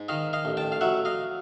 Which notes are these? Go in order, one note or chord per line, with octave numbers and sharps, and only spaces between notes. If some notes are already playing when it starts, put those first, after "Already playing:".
Already playing: G#2
D#3 D#5 F5
D#5 F5
A1
G5 A5
F5
F#3 E5 F#5
D#5 F5